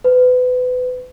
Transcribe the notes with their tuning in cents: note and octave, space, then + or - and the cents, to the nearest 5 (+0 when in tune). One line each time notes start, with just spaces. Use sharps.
B4 +30